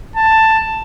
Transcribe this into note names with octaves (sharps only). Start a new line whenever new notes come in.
A5